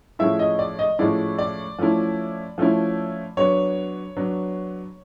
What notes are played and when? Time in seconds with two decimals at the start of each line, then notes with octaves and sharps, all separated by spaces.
0.19 A2 F3 G#3 C#4 E4 E5
0.39 D#5
0.59 D5
0.79 D#5
0.99 A2 F3 G#3 C#4 E4 D5
1.38 D5
1.79 F3 A3 C#4 E4
2.58 F3 A3 C#4 E4
3.37 F#3 B3 D4 C#5
4.17 F#3 B3 D4